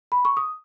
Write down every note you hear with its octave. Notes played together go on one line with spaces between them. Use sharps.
B5
C#6
D#6